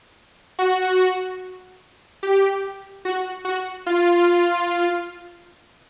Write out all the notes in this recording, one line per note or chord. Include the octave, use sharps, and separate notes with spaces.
F#4
G4
F#4
F#4
F4